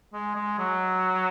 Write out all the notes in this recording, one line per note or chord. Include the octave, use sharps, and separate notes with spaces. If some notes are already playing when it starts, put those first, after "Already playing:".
G#3
G#3
F#3